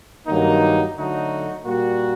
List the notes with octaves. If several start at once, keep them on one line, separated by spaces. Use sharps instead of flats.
G2 D#3 F#3 A#3 D#4
D3 F#3 A3 D#4 F#4
A#2 G3 A#3 F#4